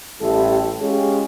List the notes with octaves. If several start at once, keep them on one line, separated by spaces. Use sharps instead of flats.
A1 G3 E4 G4 A4
G#3 C#4 F4 G4 G#4